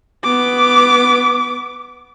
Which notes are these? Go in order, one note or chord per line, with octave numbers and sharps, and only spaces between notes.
B3 D6